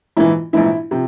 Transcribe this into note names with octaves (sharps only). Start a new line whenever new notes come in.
A#1 G#2 E3 E4
A#1 G#2 E3 E4
C3 F3